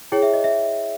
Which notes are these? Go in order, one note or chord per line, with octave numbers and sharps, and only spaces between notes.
E4 G#4 C#5 G5
E5
D#5
E5